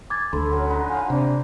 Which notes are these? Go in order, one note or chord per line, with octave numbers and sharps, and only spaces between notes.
G#5 D6 G#6 A6
D2 A4 B5 C6
F#3 C#4 A4
D3 D#4 B4
F4 F5 G#5
C3 D4